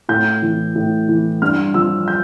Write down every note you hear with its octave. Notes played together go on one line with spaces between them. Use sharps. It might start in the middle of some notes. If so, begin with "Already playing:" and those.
A2 G6
E3
A2
E3
G2 F6
F3 E6
G6